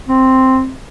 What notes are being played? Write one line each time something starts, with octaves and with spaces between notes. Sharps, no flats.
C4